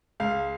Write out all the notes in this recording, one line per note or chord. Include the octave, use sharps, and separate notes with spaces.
C#2 F5